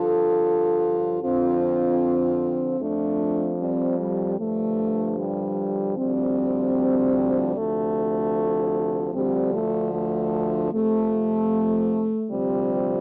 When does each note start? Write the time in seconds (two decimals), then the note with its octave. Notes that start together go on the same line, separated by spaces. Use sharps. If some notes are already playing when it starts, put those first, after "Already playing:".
Already playing: G2 D3 F3 F4 A4
1.22 F2 D3 F3 C4 F4
2.80 F2 F3 A3 D4
3.59 G3 C4
3.99 G3
4.38 G2 D3 F3 A3
5.18 G3
5.97 D2 C3 F3 G3 C4
7.55 D2 C3 F3 A3
9.14 D2 D3 F3 G3 C4
9.54 A3
9.92 A3
10.72 F2 C3 F3 A3
12.31 D2 C3 F3 G3 C4